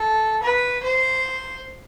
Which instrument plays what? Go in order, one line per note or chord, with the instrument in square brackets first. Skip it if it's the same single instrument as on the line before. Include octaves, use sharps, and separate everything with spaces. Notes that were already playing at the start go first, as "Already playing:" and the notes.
Already playing: [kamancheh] A4
B4
C5